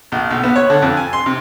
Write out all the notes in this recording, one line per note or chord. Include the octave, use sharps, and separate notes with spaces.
A#1
B1
B3
C#5
D3
F2
G#5
C6
C3